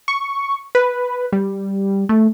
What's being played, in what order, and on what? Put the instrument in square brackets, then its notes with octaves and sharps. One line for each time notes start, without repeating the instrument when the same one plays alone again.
[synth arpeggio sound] C#6
B4
G3
A3